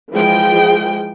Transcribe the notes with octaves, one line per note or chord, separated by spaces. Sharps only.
E3 F3 G#3 G#4 G5